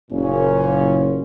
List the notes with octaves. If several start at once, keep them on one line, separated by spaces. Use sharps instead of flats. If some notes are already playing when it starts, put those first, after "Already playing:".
F#1 A#2 C#4